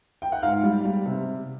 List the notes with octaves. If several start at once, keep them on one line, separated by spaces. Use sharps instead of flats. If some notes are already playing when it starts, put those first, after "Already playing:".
G5
F#5
G#2 F5
G3
G3
C3